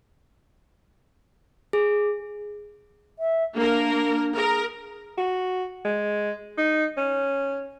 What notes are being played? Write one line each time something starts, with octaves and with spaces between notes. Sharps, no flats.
G#4
E5
A#3 D4 A#4
G#4 A#4
F#4
G#3
D#4
C#4